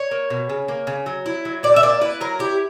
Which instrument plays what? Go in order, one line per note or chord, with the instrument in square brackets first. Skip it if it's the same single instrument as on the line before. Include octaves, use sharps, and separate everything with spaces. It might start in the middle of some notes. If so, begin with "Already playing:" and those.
Already playing: [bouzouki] C#5
A#3
B2
C#3
A#3
C#3
F#3
E4
F#3
A#2 D5
E5
A#3 D5
E4 B4
F#3 A#4
E4 G4